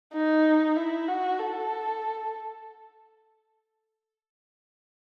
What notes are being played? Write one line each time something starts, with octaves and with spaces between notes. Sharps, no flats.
D#4
E4
F#4
A4